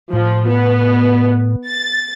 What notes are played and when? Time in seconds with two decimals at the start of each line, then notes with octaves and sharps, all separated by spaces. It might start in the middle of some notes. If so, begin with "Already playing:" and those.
0.13 A2 F3
0.49 B3
1.68 A6